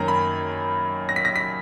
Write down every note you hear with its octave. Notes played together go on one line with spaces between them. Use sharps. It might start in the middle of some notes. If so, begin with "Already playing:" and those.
Already playing: F#2 D#3 A#3 C#4 A#5
B5
A#6
B6
A#6
B6